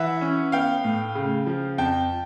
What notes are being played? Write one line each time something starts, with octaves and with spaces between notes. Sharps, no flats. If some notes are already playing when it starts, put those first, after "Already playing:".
Already playing: E3 E5 F#5
C#4
B3 F5 G5
A2
C#3
F3
F2 G5 A5